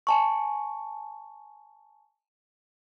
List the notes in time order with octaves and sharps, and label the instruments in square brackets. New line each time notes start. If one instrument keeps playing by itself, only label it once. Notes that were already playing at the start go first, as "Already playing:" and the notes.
[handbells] G#5 A5 C#6